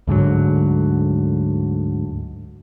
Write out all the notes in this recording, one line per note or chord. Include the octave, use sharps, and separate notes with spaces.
D2 G#2 D3 F#3